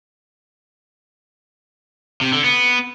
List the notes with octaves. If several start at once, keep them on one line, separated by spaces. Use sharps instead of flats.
C3
D3
B3